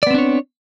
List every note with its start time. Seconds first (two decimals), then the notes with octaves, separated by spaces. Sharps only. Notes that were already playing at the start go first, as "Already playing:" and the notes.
0.03 D5
0.07 B3
0.11 C4
0.14 D4
0.18 C#5